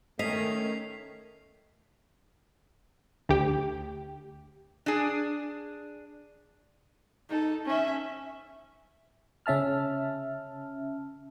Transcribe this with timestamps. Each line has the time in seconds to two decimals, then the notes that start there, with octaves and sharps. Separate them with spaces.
0.19 D#3 A3 C#4 D#5 B6 C7 F7
3.29 D2 G4
4.86 D4 G#4
7.29 D#4 A4
7.65 C#4 E5
9.46 C#3 C#4 E5 A5 F6